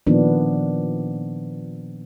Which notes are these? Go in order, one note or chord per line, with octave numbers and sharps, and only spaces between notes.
A#2 D#3 F3 A#3 B3 D4